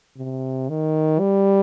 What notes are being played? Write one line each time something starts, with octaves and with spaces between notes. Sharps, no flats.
C3
D#3
G3